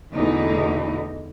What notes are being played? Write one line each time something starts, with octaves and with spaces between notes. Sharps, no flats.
E2 B2 D3 E3 A3 D#4